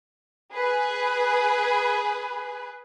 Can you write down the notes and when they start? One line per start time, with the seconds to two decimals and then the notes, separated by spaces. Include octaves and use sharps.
0.53 G#4 B4